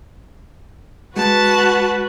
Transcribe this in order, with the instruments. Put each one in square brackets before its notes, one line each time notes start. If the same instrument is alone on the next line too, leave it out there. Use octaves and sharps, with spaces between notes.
[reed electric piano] G#3 [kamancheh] F#4 B4 [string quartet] A5